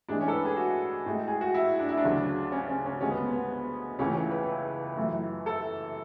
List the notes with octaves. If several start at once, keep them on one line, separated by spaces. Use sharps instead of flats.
A2 E3 G#3 D4
C#4
A4
B4
G#4
F#4
A2 G#3
G#4
F#4
E4
D4
E4
D4
D2 C#3 F#3
C#4
C#4
C#4
D2 D3 G#3 C#4
B3
B3
C#2 C#3 E3 A3 C#4
C#4
B4
F#2 E3 A3
A4